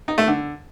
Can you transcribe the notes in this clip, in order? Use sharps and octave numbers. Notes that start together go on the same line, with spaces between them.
D#4
A3
D3